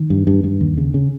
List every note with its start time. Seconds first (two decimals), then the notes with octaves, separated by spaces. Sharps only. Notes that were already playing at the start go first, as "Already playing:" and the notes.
Already playing: D#3
0.10 G2
0.27 G2
0.44 G2
0.61 D#2
0.77 C#3
0.94 C#3